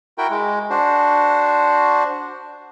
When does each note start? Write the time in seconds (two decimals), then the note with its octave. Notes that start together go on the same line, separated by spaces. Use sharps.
0.18 E4 F#4 A#4 G5
0.30 G#3
0.70 D4 F#4 C5